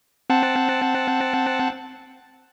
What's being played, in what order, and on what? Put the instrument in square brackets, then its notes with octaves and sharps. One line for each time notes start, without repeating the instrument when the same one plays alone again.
[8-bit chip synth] C4 F#5 A5